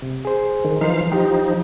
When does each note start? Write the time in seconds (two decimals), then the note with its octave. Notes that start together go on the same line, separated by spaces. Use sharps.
0.02 C3
0.25 G#4 C5
0.64 D#3
0.81 E3 F3 D#4 C5 F5
1.12 F3 D#4 G4 G5